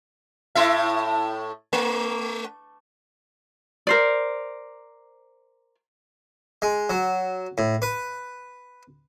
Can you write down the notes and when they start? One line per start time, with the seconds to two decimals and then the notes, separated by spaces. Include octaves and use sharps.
0.55 A2 E4 E5
1.73 A3
3.87 A#4 C5 D5
6.62 G#3
6.90 F#3
7.58 A2
7.82 B4